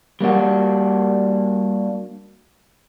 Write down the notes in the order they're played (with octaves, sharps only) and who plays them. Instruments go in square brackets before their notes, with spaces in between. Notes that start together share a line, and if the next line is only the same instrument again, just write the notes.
[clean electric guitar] G3 A#3 D4 F#4